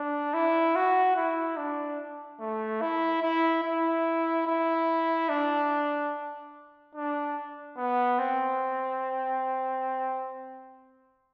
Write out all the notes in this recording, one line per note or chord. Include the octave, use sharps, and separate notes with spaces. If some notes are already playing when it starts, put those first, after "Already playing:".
Already playing: D4
E4
F#4
E4
D4
A3
E4
E4
E4
E4
D4
D4
B3
C4